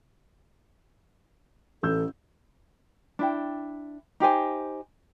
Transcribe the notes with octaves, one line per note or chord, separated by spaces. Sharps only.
A1 A4 E6 G6
D4 E4 G5
D#4 G4 C5 G#5